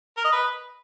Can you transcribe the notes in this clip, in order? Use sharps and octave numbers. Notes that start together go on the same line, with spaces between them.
A#4
D#5
B4